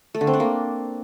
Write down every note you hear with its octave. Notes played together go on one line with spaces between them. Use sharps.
A3
D3
C4
D4
A#3